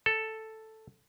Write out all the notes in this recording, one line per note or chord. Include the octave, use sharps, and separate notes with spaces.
A4